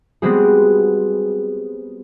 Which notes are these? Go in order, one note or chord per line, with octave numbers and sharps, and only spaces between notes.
G3 G#3 B3 C4 F#4 G#4